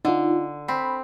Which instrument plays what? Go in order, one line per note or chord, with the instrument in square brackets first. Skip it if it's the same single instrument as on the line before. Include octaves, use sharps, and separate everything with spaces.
[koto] D3 [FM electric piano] D#4 F4
[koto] C4 [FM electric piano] B5